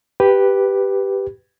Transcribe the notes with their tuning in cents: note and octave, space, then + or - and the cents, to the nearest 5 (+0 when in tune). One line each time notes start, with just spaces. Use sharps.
G4 +0 B4 +0